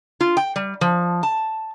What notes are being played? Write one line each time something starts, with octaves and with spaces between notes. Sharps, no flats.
F4
G5
G3
F3
A5